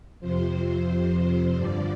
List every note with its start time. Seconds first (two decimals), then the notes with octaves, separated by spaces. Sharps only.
0.20 F2 C3 F3 C5
1.54 G2 D3 F3 D5